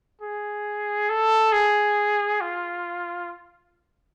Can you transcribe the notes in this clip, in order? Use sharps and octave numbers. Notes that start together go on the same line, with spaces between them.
G#4
A4
G#4
F4